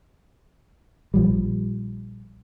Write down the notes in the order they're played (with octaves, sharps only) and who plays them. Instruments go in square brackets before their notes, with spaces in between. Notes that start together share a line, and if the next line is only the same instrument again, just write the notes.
[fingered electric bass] A#1 F3 G3